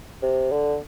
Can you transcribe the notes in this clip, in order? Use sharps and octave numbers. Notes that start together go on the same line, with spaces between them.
C3
D3